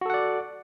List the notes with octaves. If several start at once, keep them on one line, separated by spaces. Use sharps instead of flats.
F#4 A4 D5 F#5